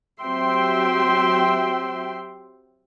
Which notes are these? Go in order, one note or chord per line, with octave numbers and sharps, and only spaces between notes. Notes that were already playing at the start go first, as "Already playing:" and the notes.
F#3 C4 G4 E5 G5 C6